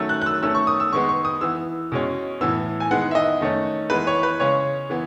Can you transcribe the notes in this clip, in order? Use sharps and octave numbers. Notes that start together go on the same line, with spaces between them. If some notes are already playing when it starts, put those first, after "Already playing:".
Already playing: D#3 F#3 A3 C#4 E6
F#6
F#6
E6
D#3 A3 C#4 E6
C#6
D#6
E6
D#3 G#3 B3 C#6
C#6
D#6
E3 B3 E6
B2 G#3 C#4
A2 E3 B3 E6
G#5
D#3 G#3 B3 F#5
E5
D#5
D#3 A3 C#4
E3 G#3 B3 B4
C#5
B4
C#3 G#3 C#4 C#5
E3 B3